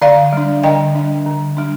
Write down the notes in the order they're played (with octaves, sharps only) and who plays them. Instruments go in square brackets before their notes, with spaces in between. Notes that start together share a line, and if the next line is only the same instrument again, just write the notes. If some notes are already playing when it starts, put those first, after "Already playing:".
[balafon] D3 D5 F5
G3 D4
D3 D#5 G5
G3 D4
D3
G3 D4